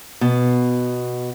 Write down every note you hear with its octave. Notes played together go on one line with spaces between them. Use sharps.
B2